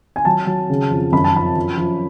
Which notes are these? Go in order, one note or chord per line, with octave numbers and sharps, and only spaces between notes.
G#5
F#3 A5
F#3
C#3
F2
F#2 B5
A5
F3 B5
F3
F3